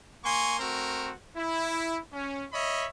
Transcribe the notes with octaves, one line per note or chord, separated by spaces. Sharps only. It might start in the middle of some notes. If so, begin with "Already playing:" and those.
A#3 G#5 C6 C#6
A3 C4 F#4 A#4
E4
C#4
C#5 D#5 E5 B5